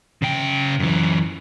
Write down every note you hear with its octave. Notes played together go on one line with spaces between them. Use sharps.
C#3 G5
F#2 E3